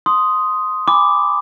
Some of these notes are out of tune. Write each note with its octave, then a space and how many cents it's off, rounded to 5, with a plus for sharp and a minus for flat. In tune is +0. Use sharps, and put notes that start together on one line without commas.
C6 +0 D#6 +0
G#5 -25 B5 +15 D6 +0